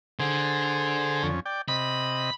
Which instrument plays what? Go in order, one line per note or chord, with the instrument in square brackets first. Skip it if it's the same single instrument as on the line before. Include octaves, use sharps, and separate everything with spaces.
[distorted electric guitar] D3 [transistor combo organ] G#4 C5
[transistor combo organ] F2 C#4
D5 G5
[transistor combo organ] C3 D#5 [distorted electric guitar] B5